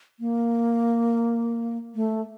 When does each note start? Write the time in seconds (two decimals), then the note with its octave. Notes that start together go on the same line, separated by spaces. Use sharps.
0.20 A#3
1.95 A3